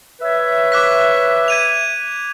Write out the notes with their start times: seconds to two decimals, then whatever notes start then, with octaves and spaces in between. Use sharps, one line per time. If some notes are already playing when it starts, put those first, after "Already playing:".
0.21 B4 C#5 E5
0.72 D6 F#6 B6
1.48 G#6 D#7 F7